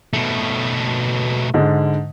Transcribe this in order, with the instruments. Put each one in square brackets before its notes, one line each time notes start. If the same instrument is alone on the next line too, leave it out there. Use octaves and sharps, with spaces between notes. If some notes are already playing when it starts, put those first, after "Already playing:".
[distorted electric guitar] B2 A3
[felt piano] G#2 D3